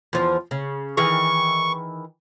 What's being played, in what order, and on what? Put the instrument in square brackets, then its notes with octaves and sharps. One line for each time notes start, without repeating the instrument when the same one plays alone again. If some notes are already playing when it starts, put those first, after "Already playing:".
[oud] E2 F3
C#3
[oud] D#3 E3 G#4 [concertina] C#6